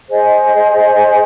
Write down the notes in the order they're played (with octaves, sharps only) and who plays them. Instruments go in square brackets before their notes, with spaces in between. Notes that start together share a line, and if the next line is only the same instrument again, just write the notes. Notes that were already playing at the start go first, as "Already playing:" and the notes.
[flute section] G#4 C5 D#5 G#5